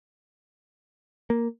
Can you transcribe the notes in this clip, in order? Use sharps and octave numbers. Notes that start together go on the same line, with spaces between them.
A#3